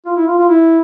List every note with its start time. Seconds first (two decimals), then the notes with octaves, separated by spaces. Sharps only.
0.06 F4
0.16 E4
0.27 F4
0.39 F4
0.49 E4